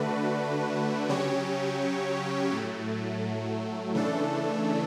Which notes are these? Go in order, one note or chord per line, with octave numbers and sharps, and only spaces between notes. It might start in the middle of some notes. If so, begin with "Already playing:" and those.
Already playing: D3 A3 D4 F#4 B4
C#3 F#3 C#4 G4 C#5
A2 F#3 A3
C#3 E3 A3 D4 A4